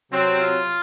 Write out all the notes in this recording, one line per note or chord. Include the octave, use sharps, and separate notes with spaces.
C3 F#3 C4
F4